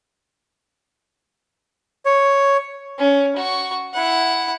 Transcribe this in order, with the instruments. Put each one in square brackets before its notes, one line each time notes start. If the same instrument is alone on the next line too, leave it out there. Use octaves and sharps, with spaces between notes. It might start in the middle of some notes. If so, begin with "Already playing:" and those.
[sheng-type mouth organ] C#5
[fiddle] C#4
F#4 C#6
E4 F#5